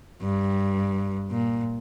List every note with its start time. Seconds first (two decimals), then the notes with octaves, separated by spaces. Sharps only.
0.23 G2
1.31 A#2